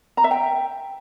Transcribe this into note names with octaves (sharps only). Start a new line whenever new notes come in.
A#5
E5
G5